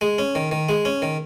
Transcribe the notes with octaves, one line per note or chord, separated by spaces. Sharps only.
G#3
C#4
D#3
D#3
G#3
C#4
D#3